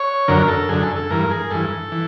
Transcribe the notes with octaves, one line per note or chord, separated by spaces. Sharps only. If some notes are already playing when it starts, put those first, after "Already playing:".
Already playing: C#5
F#2 D3 A#4
A4
F#2 D3 G#4
A4
A4
G2 E3 A#4
G#4
G2 E3 A4
E3